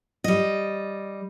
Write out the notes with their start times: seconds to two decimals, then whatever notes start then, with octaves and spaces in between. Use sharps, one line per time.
0.24 G3 D#5